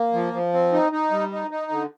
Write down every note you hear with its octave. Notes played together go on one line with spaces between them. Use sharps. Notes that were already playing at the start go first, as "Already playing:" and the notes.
Already playing: A#3
F3
F3
C4
D#4
D#4
G3
D#4
D#4
D3